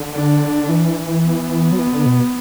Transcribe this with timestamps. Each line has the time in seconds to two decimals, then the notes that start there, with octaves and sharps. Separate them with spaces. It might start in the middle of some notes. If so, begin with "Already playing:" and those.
Already playing: D3
0.15 D4
0.69 E3
1.24 B3
1.72 F#3
1.79 E3
1.87 B2
1.92 D3
2.06 B2